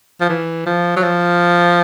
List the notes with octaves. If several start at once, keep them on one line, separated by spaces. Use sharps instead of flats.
F3
E3
F3
F#3
F3